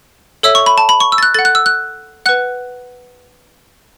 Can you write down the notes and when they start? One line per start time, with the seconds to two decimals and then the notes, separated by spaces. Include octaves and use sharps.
0.43 A4 C#5 E5 E6
0.55 C#6
0.66 B5
0.78 A5
0.89 B5
1.00 C#6
1.12 E6
1.18 A6
1.23 F#6
1.34 A4 F#5 A6
1.45 F#6
1.55 E6
1.66 F#6
2.26 B4 F#5 F#6